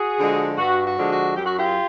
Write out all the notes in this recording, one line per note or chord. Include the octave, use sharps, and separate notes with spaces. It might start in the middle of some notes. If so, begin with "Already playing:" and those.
Already playing: F#4 G#4
D3 F3 G#3
G2 F#4
F#4
D3 F3 G#3
F#4
F#2 G4
F#4
F4 G4